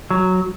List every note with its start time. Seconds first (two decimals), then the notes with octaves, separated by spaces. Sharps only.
0.11 F#3